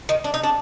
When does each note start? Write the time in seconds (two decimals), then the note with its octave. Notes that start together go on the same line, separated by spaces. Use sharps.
0.09 D#3
0.24 D4
0.34 D#4
0.44 D4